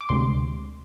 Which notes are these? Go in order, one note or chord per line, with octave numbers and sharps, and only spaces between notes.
D6
D2 C3 G#3 C6